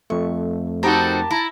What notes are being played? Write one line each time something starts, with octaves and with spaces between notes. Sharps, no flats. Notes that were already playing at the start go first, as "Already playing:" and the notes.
F2 A3 C#6
C4 D#4 F#4 G4 A#4 A5 B5
E4 A#5